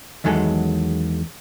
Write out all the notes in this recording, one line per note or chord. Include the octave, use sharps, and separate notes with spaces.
E2 D#3 F#3 G#3 A4